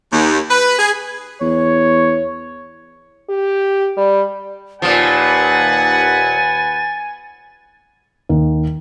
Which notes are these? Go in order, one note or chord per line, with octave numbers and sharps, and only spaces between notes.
D#2
B4
G#4
E2 C#5
G4
G3
D#2 A#2 F3 B4 F#5 G#5 A6
D#2